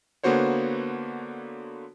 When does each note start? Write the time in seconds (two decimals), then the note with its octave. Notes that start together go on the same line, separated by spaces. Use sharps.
0.24 D3 A#3 B3 F#4 C5 C#5